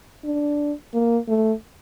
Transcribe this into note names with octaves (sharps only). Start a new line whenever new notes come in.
D4
A#3
A3